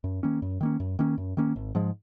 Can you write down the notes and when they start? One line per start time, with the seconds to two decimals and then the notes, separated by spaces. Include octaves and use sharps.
0.04 F#2
0.23 D#3 A#3 C#4
0.42 F#2
0.61 D#3 A#3 C#4
0.80 F#2
0.99 D#3 A#3 C#4
1.18 F#2
1.37 D#3 A#3 C#4
1.56 G#1
1.75 G#2 F3 G#3